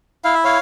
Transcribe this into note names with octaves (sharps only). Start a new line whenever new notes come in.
E4 F5
E5
C#5 F5